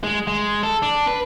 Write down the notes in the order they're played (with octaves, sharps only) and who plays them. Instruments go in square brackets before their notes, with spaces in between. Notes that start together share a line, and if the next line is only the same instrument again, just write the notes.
[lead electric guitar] G#3
G#3
A4
D4
B4